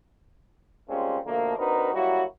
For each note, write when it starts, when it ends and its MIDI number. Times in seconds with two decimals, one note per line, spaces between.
0.89 1.18 55
0.89 1.18 56
0.89 1.18 58
0.89 1.18 60
0.89 1.18 61
0.89 1.18 65
1.25 1.53 47
1.25 1.53 50
1.25 1.53 53
1.25 1.53 57
1.25 1.53 58
1.57 1.92 60
1.57 1.92 62
1.57 1.92 63
1.57 1.92 66
1.57 1.92 70
1.57 1.92 71
1.93 2.23 54
1.93 2.23 55
1.93 2.23 58
1.93 2.23 64
1.93 2.23 66